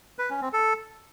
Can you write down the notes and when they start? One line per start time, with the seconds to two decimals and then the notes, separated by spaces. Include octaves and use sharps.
0.19 B4
0.30 C#4
0.42 C4
0.53 A4